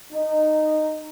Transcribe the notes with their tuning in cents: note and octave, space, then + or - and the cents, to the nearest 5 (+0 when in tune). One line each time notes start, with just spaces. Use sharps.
D#4 -15